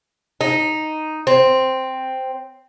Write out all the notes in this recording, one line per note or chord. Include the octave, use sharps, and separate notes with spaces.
D#4
C4